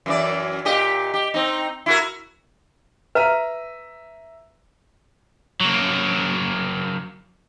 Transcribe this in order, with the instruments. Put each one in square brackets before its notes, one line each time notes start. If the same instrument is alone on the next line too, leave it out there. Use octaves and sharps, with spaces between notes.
[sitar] F#2 E3 D5
A#2 G4 D#5
G4
C4 D#4
E4 F#4 A#4
[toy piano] B4 [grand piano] E5 A#5 D#7
[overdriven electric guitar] F#3 A#3